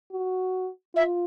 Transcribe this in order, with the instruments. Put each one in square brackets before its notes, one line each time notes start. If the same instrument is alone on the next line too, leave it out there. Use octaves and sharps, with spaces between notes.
[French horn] F#4
[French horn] F4 [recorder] E5